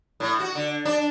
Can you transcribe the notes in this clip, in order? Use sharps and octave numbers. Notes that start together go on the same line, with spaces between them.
A2
F#4
D3
D4